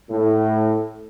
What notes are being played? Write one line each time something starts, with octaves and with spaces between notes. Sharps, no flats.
A2